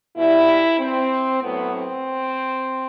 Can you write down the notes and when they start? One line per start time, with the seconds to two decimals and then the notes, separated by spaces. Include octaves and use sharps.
0.18 B2 G3 E4
0.80 C4
1.43 A2 F#3 B3
1.75 C4